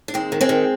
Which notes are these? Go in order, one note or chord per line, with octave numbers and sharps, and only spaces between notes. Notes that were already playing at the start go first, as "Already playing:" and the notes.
D4
D#2 G#3 C4
D#3
G#3 C4
D#3